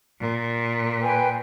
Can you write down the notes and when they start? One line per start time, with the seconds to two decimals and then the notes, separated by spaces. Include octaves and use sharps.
0.19 A#2
1.01 B4 G5 G#5